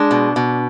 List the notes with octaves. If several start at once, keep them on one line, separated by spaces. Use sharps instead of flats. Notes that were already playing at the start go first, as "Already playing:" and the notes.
Already playing: G#3 D4
B2
B2